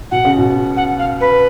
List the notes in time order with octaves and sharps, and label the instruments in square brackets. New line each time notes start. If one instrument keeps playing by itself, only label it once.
[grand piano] B2 [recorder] F#5
[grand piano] C#3
B2
[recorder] F#5
F5
B4